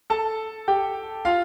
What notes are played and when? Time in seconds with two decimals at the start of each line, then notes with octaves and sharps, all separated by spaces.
0.10 A4 A5
0.68 G4 G5
1.25 F4 F5